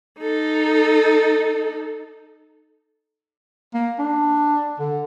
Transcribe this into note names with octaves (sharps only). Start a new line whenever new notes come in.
D#4 A4
A#3
D4
D3